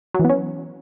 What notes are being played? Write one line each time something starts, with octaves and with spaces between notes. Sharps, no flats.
F#3
E3
B3
C#4